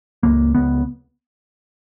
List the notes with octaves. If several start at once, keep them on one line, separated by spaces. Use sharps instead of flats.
C#2 A#3
C#2 B3